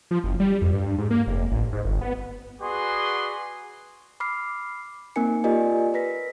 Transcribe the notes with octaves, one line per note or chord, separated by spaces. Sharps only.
F3
F#1
G3
F2
G2
G#2
A#3
F1
A1
G#2
G1
B3
F#4 G#4 B4 D5 C6
B5 D6 F6 C7
A#3 C4 D#4 A#4 G#5 C#7
F4 G4 A#4 D5 D#5 G#5
A#4 B4 A#6 B6